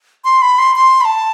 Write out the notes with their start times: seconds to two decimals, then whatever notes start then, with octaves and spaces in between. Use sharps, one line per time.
0.25 C6
0.42 B5
0.58 C6
0.76 C6
1.01 B5
1.05 A5